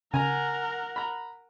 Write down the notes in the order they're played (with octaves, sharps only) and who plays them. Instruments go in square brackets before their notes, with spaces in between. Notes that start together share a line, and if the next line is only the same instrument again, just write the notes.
[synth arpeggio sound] C#3 [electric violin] A#4 F#5 [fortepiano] G#5 A#5
[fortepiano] A#5 B5